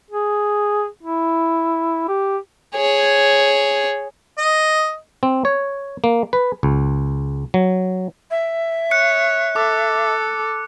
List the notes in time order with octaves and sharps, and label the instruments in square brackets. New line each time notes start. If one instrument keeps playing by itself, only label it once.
[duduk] G#4
E4
G4
[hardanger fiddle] G#4 C#5
[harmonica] D#5
[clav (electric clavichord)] C4
C#5
A#3
B4
C#2
F#3
[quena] E5
[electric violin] C#5 [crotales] F#6 C#7
[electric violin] A4 [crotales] D6